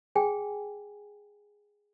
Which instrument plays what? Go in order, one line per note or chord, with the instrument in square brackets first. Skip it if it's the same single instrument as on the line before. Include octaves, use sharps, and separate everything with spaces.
[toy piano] G#4 G5 G#5